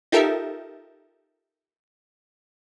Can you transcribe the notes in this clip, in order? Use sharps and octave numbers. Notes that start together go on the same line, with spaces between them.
D#4 F4 G4 A4 A#4 E5